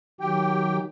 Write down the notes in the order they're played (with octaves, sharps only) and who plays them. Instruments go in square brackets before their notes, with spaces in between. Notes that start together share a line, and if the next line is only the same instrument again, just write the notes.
[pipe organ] D#3 F#3 [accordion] G4 G5